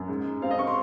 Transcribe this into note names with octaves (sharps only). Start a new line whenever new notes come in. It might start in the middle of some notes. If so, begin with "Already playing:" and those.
Already playing: F#2
G#2
G#2
C4 F5
D#5
C4 C#6
C6